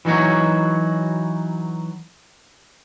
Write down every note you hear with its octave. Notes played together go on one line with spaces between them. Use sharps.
E3 F#3 D#4 F#4 C#5